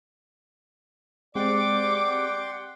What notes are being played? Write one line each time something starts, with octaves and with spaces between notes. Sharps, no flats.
G#3 C4 G4 D5 F#5 G5 C6 D6